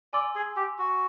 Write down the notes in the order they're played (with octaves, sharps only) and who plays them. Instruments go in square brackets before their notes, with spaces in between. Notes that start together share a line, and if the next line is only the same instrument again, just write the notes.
[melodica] D5 [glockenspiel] G#5 C6 E6
[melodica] G#4
G4
F#4